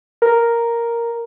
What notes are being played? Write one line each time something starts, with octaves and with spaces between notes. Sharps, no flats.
A#4